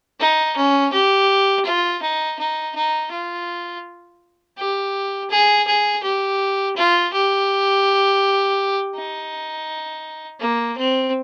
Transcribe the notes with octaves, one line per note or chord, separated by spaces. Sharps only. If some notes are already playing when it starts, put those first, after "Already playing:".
D#4
C#4
G4
F4
D#4
D#4
D#4
F4
G4
G#4
G#4
G4
F4
G4
D#4
A#3
C4